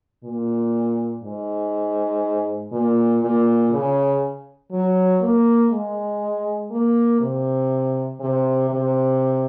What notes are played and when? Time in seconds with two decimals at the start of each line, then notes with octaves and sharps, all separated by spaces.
0.24 A#2
1.23 G#2
2.72 A#2
3.22 A#2
3.72 C#3
4.72 F#3
5.21 A#3
5.71 G#3
6.71 A#3
7.20 C3
8.20 C3
8.70 C3